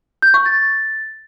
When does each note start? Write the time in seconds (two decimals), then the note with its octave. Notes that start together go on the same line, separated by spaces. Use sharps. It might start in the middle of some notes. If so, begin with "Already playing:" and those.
0.22 G6
0.34 C#6
0.46 A6